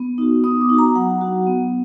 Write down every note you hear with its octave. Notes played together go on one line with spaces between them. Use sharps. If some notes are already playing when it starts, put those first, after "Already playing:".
Already playing: B3
D#4 F#4
B3 D#6
D6
D#4 F#4
A#5
F#3 F#5
D4 F#4
B3